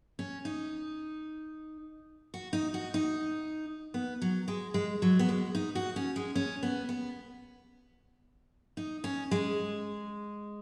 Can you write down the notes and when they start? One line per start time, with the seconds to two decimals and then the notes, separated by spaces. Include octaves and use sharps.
0.19 C#4
0.45 D#4
2.34 F#4
2.53 D#4
2.74 F#4
2.94 D#4
3.94 B3
4.22 F#3
4.48 G#3
4.74 G#3
5.02 F#3
5.19 B3
5.29 G#3
5.55 D#4
5.75 F#4
5.96 C#4
6.16 G#3
6.35 C#4
6.63 B3
6.89 B3
8.77 D#4
9.04 C#4
9.31 G#3